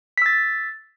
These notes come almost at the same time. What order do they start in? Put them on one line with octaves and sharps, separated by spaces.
B6 E6 A6